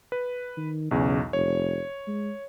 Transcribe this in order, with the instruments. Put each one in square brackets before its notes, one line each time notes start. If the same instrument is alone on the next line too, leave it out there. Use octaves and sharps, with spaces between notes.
[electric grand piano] B4
[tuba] D#3
[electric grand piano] B1 E2 [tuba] C#3
[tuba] F1 [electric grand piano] C#5
[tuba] G#3